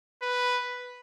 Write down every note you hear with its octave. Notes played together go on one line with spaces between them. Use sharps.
B4